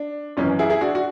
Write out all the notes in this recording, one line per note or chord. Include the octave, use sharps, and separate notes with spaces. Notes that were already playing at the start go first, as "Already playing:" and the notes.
Already playing: D4
G#1 F#2 E3 C#4
E4 G#4
E4 G#4
D4 F#4
F#4